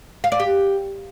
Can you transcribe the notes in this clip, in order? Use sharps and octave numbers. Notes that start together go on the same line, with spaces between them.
F5
D5
G4